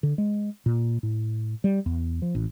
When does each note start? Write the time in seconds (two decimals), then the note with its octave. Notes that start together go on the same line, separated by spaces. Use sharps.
0.03 D3
0.18 G#3
0.66 A#2
1.03 A2
1.64 G3
1.86 E2
2.22 F3
2.35 A1